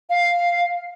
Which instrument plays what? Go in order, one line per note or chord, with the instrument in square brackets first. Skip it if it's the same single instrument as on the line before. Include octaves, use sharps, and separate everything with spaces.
[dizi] F5